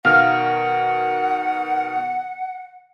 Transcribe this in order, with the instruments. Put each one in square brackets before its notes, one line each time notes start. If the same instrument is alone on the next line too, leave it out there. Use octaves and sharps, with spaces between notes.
[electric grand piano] B2 D#3 A#4 [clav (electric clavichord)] F5 [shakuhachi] F#5